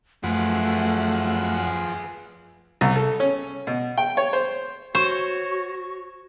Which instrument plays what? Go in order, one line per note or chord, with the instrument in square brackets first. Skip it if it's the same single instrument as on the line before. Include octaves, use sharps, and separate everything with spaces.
[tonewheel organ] F#2 F#5 [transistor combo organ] F3 [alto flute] A3 [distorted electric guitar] G#4 B4
[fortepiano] C2
A4
C#4
B2
G5
C#5
C5
[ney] F#4 [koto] C5 [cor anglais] C#5 [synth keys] C#6